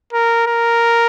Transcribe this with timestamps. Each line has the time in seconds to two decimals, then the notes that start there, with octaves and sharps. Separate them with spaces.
0.13 A#4
0.47 A#4